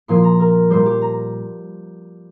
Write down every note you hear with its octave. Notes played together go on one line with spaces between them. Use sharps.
A#2 F3 C6
A#5
A#4
A#2 G3 C5
G4
A#5